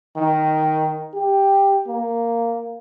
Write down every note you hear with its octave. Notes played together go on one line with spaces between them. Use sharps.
D#3
G4
A#3